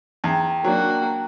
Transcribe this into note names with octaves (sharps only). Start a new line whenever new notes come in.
E2 G5 A5 A#5
F#3 A#3 D4 F#4